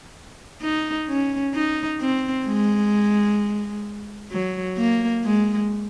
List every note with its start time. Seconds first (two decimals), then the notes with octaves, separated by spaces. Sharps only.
0.62 D#4
1.08 C#4
1.54 D#4
2.01 C4
2.46 G#3
4.32 F#3
4.77 A#3
5.24 G#3